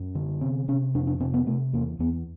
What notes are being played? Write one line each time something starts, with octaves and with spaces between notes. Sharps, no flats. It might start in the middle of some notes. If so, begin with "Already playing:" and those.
Already playing: F#2
D3
C3 C4
C3 C#4
F2 D4
D4
C3 C4
B3
C3 A3
E2 A#3
E2 B3